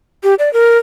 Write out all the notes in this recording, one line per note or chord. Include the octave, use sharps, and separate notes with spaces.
G4
D5
A#4